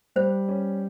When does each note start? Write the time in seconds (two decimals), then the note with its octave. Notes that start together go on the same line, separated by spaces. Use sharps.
0.16 G3 C5
0.49 C#4